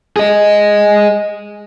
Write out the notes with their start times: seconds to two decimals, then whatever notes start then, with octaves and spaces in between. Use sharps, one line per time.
0.17 G#4 D#5